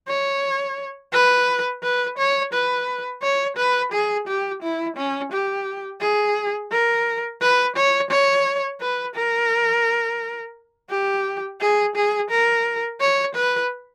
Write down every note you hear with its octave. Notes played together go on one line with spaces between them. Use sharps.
C#5
B4
B4
C#5
B4
C#5
B4
G#4
G4
E4
C#4
G4
G#4
A#4
B4
C#5
C#5
B4
A#4
G4
G#4
G#4
A#4
C#5
B4